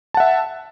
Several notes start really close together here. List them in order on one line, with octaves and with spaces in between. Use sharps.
A5 F#5 E5